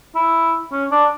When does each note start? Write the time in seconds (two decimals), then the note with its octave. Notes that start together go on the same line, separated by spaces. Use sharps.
0.15 E4
0.72 C#4
0.91 D4